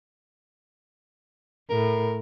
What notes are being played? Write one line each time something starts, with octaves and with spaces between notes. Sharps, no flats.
A2 A#4